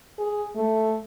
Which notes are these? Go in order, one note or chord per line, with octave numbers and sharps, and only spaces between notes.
G#4
A3